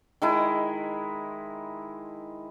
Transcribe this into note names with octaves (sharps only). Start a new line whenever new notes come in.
D#3 G#3 E4